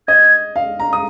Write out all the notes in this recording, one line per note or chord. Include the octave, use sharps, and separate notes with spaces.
D#5 G#6
F5
A#5
D#6